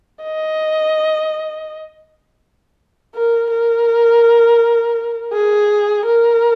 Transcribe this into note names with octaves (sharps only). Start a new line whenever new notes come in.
D#5
A#4
A#4
G#4
A#4